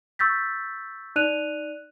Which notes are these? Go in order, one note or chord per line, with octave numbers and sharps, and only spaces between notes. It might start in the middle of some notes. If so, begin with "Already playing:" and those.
C#6 E6 G6 A6 B6
D#4 D5 F#6 D#7 F7